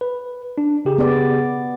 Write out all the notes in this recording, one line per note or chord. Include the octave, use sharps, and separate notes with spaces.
B4
D4
C#3 G4 G#4
B3 D5